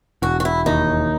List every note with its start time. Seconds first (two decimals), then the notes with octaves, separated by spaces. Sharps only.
0.22 E1 F#4
0.40 F#4
0.45 E4
0.66 D#2 D#4